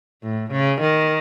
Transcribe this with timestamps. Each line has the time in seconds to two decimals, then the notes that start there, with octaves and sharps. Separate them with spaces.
0.23 A2
0.51 C#3
0.81 D#3